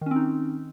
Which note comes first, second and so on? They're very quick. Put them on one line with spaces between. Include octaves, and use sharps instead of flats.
D#3 C#4 C4 D#4